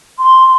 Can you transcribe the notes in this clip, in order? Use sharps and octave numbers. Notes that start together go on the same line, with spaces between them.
C6